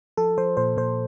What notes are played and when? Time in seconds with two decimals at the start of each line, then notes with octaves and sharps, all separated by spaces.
0.17 F3 A4
0.38 F3 C5
0.57 A#2 C5
0.77 A#2 C5